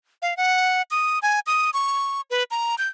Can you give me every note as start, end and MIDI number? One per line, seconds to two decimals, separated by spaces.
0.22 0.36 77
0.37 0.82 78
0.91 1.19 87
1.22 1.40 80
1.47 1.70 87
1.74 2.21 85
2.30 2.44 71
2.51 2.75 82
2.78 2.88 91